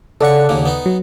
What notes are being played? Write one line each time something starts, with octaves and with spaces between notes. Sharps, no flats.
C#3 A4 D5 F#5 C#6
D#2 C#3 A#3
B3 D#4
F#3